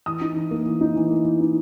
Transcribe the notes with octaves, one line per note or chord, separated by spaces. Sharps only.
E3 D#6
D#4
E3
A#3
E3
D#4
E3
A#3
E3
D#4